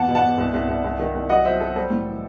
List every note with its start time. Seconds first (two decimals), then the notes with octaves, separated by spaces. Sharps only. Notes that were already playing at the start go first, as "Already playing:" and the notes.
Already playing: E2 F#5 A5
0.08 B2
0.15 F#5 A5
0.23 B2
0.38 C2
0.53 C2
0.68 C2
0.84 C2
0.99 D#3
1.15 C2
1.29 F#3 D#5 F#5
1.45 F#3 C5 E5
1.60 F#3 A4 C5
1.76 G3 A4 C5
1.90 A2
2.06 E3